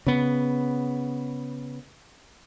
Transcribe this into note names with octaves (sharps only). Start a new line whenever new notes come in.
C#3 B3